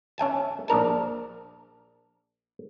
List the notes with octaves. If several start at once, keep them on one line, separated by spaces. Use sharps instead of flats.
C#4 E5 G#5 A5
A#1 D4 A#4 A5